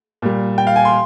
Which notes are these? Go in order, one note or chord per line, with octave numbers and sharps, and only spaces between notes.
A#2 G3
G5
F5
G#5
C6